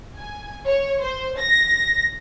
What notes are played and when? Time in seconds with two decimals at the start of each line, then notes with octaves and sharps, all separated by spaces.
0.16 G#5
0.65 C#5
1.01 C5
1.38 A#6